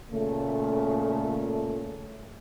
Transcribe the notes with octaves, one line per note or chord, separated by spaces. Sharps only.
A#2 C#3 A3